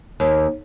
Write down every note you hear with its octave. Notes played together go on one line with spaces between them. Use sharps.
D#2